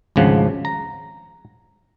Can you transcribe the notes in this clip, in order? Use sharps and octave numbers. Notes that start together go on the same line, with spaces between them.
G#1 D2 C#3 F3 F#5
A#5